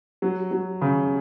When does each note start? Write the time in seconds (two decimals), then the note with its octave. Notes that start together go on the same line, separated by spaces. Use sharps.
0.22 F#3
0.51 F#3
0.81 C#3